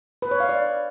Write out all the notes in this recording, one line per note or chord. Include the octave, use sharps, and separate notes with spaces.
B4
C#5
F5
D5